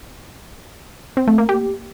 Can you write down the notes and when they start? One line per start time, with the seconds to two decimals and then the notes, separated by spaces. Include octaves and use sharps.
1.17 C4
1.28 A3
1.38 A#3
1.49 G4